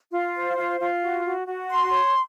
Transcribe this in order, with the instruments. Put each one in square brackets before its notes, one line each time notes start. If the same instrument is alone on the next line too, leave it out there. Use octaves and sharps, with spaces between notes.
[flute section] F4
C5
F4
F4
F#4
F#4
F#4
C6
C#5